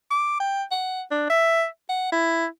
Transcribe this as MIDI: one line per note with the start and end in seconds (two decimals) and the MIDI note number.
0.11 0.36 86
0.40 0.63 79
0.71 1.03 78
1.11 1.29 62
1.30 1.66 76
1.89 2.10 78
2.12 2.46 64